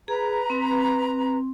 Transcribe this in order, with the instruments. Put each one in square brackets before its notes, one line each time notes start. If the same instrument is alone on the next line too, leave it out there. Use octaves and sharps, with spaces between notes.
[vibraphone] G#4 [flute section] B4 A#5
[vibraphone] C4